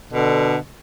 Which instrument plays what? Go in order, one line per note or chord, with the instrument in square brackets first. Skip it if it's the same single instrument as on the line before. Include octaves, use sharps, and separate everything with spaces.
[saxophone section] B2 D3